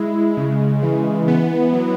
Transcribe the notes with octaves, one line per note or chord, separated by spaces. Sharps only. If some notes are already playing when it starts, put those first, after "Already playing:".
Already playing: G#3 E4
C#3
E3
B3
F#3